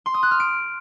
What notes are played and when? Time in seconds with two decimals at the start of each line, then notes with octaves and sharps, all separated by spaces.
0.06 C6
0.14 D#6
0.23 F#6
0.31 F6
0.40 D7